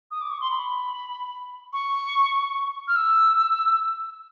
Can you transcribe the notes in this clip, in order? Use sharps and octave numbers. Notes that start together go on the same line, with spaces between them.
D#6
D6
C#6
C6
B5
C#6
F6
E6